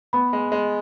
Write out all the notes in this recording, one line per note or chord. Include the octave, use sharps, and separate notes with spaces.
B3 B5
G#3
G#3